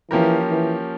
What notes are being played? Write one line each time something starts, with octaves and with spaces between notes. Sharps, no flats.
E3 F3 A#3 C#4 G4 A#4
E3